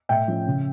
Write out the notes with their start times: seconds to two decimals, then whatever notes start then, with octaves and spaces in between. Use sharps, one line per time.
0.09 A2 E5 G5
0.28 F3 C#4
0.47 C#3